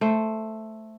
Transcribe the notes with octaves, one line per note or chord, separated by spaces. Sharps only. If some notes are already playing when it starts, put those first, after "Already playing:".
A3 C5